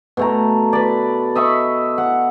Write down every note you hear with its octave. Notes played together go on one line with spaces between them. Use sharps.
B2 A3 A#5
B4 D5
D#5 E5 B5 C#6
F#5